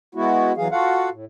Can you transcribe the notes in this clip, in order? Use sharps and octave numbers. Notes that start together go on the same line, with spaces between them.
G#3 B3 E4 F#4
E2 E3 F#3 G#4 F5
F4 F#4 A4 F5 F#5
A2